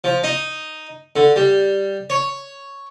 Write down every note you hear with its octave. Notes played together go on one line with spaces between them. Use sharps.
F3
D#4
D3
G3
C#5